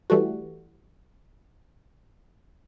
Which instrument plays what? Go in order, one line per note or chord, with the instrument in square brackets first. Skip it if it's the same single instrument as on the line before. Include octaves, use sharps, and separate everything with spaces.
[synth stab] E3 G3 A3 F#4